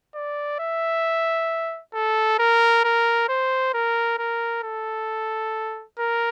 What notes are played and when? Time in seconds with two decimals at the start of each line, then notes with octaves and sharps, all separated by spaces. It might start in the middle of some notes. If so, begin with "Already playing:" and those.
0.15 D5
0.60 E5
1.94 A4
2.39 A#4
2.84 A#4
3.28 C5
3.74 A#4
4.19 A#4
4.63 A4
5.98 A#4